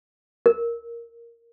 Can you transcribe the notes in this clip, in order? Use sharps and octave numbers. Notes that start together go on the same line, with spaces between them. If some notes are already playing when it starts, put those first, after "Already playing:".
A#4